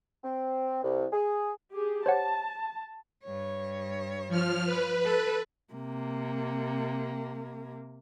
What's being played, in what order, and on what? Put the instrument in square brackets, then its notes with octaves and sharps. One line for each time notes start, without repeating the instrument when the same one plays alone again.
[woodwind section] C4
C2
G#4
[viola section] G4 G#4
[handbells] C5 C#5 F#5 [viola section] A5
[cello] G2 C#5
[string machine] F3 F6
B4
[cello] A4
C3 A#3